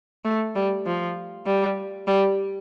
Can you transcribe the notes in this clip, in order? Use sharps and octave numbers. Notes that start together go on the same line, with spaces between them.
A3
G3
F3
G3
G3